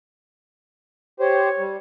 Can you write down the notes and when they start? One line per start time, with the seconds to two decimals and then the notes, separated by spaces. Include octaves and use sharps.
1.20 G4 C5 C#5
1.58 G3